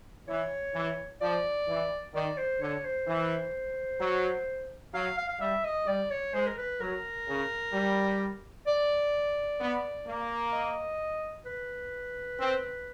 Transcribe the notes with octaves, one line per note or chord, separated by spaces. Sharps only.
E3 C#5
E3
F3 D5
E3
D#3 D5
C5
D3 C#5
C5
E3
F#3
F#3 F5
F5
F5
G3 E5
D#5
G3 D5
C#5
G#3 C5
A#4
B4
F#3 A#4
C#3
G3
D5
B3
A#3
D#5
B4
C4